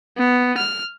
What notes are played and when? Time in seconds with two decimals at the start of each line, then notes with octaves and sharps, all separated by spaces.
0.18 B3
0.57 F6